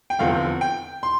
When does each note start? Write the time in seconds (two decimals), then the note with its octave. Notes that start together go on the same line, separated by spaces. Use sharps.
0.10 G5
0.19 F1 E2 D3 F3 C4 F5
0.61 G5
1.03 C6